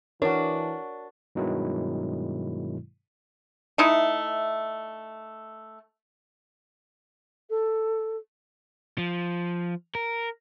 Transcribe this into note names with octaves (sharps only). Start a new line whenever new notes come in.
E3 D4 F#4 A#4 C#5
G2 B2 D#3 F#3 G#3 E4
A3 D#4 E4
A4
F3
A#4